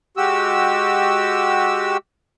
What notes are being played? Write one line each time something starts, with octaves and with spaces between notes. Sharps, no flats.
G#3 F#4 G4 E6